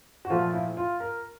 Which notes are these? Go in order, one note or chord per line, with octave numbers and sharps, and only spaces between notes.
F#4
A#2 F3 A3 F4
E4
F4
A#4